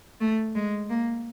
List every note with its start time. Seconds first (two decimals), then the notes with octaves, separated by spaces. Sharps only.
0.21 A3
0.55 G#3
0.90 A#3